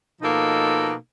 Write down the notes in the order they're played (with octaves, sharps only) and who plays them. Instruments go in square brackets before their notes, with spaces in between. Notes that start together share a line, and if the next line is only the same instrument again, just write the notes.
[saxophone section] B2 F3 A#3 D#4 A4